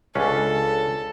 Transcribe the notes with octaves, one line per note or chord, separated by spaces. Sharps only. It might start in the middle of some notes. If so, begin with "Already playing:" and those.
C#2 C#4 D4 A4